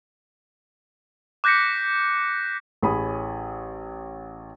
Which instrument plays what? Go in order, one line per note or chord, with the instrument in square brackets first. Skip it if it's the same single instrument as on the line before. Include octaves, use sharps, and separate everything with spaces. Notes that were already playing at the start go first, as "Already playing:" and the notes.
[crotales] D6 F#6 G6 A#6 B6 C#7
[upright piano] A1 G#4 C#5 B5 D#6